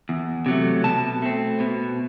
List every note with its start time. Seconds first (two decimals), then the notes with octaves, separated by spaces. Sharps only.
0.09 E2
0.46 C3 F#3 A3
0.84 B2 A5
1.22 A3 C4
1.60 B2